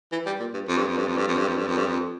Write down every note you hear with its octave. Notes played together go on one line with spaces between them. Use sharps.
E3
G3
A#2
G2
F2
G2
F2
G2
F2
G2
F2
G2
F2
G2
F2
G2
F2